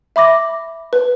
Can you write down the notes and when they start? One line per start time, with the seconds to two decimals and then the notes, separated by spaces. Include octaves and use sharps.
0.16 E5 B5 D6 A#6
0.93 B4